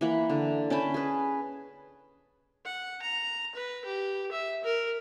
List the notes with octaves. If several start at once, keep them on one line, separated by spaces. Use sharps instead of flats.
E3 A#3 F#5 B5
D3
C#4 G5 A5 B5
G#4 B4
F#5
A#5
B4
G4
E5
A#4